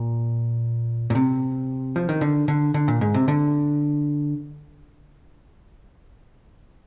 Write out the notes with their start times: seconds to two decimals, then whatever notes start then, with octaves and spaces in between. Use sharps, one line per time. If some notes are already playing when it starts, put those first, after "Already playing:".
Already playing: A#2
1.10 A#2
1.15 C3
1.96 F3
2.09 D#3
2.21 D3
2.48 D3
2.74 D3
2.88 A#2
3.01 G#2
3.14 C3
3.28 D3